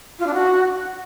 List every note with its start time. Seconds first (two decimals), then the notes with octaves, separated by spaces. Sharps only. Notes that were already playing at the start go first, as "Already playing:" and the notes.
0.19 F4
0.26 D4
0.34 F#4